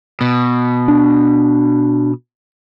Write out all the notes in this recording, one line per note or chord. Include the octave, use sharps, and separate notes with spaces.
B2
D4